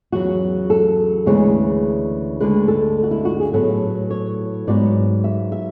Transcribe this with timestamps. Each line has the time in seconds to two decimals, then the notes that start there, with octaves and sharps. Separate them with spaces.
0.12 E2 C#3 F#3 F#4
0.70 A4
1.26 D2 C#3 E3 G#3 B3 C#5
2.40 D2 D3 G#3 B4
2.68 A4
3.03 F#4
3.11 E4
3.25 F#4
3.40 G#4
3.53 A2 F#3 B3 A4
4.11 C#5
4.67 G#2 F#3 B3 D5
5.24 E5
5.52 E5